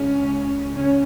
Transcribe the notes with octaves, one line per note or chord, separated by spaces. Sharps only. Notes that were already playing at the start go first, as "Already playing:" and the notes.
Already playing: C#2 C#3 C#4
C#3 C#4